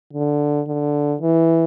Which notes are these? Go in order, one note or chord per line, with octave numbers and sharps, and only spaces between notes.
D3
D3
E3